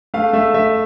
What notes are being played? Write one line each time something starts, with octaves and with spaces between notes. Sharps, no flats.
A3 F5
A3 E5
A3 E5